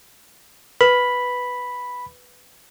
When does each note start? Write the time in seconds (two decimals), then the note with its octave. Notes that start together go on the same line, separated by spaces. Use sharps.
0.81 B4 B5